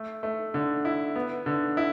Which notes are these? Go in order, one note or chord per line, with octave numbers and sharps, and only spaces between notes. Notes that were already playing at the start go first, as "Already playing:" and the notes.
Already playing: A3
A3
D3
E4
B3
D3
E4